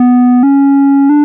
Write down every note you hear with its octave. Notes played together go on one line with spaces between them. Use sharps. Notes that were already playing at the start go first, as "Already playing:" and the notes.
Already playing: B3
C#4
D4